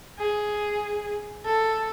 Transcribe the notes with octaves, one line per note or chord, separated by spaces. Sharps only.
G#4
A4